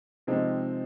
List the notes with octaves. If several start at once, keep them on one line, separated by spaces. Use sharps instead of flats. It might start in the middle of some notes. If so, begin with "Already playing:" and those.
C3 F3 G#3 C4 D#4